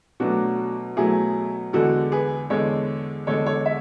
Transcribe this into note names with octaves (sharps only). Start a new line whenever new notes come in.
B2 F#3 A3 D4 F#4
B2 F#3 A3 E4 G#4
E2 D3 G#3 F#4 A4
G#4 B4
E2 D3 G#3 A4 C#5
E2 D3 G#3 A4 C#5
A4 C#5
C#5 E5